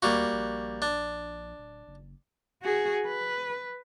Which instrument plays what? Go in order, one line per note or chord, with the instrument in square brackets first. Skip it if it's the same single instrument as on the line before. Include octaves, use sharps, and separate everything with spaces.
[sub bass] D2 [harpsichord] G3 A#3 F#4
[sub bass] A#1
[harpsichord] D4
[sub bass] D1
F#1
[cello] F#4 G#4
B4